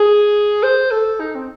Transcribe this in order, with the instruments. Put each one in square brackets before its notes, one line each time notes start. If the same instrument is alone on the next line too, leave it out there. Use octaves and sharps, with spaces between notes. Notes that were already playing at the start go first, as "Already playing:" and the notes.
Already playing: [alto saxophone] G#4
C5
A4
D#4
C4